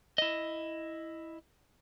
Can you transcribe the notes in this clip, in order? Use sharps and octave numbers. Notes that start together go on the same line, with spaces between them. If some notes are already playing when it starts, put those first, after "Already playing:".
E4 D#5